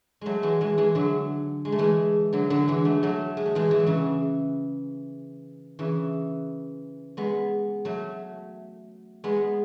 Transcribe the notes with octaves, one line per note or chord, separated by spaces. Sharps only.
F#3 G#3 A3
E3 G#3
E3 G#3
E3 G#3
D3 F#3
G#3
A3
E3 G#3
D3 F#3
D3 F#3
E3 G#3
F#3 A3
F#3 A3
G#3
A3
E3 G#3
E3
F#3
C#3 E3
C#3 E3
G#3 B3
F#3 A3
G#3 B3